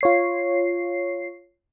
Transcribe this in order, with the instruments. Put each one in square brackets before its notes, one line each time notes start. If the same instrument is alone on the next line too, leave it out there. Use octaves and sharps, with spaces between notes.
[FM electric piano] F4 C#5 C7